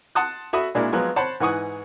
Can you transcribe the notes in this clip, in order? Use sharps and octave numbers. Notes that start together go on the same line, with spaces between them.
F#5 A5 C6 D#6 F#6
F#4 A4 E5 B5 D#6
A#2 G#3 D4 E4 F#4 A#4
F3 F#3 G#3 B3
C5 C#5 F#5 A5 B5 C6
G#2 E3 F#5 C#6 D#6